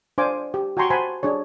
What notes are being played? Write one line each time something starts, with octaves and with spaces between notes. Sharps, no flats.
D4 C5 D5 F5 G#5 D6
G4
F#4 G5 G#5 A#5 C6 C#6
C5 F#5 G#5 A5 B5 C6
D4 G#4 C#5